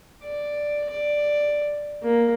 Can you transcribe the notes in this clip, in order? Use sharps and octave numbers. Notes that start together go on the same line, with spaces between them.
D5
D5
A#3